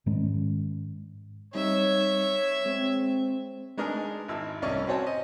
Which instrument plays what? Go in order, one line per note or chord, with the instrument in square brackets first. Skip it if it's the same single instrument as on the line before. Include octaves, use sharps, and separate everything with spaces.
[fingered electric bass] G#2 D#3 G#3 C#4
[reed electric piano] G3 C4 D#4 [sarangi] C#5 [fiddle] E5
[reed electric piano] G#3 [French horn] C4
[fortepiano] G#3 D4 D#4 G#4 A#4
G#1 E4 E6
C2 C#4 D5 D#5 C#6 F6
C4 F#4 C5 C#5 G#5 A5
D#5